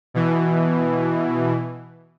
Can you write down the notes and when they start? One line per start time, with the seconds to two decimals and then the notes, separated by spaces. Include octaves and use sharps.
0.14 B2 E3